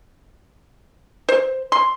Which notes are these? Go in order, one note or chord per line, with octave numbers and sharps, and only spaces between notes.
C5
C6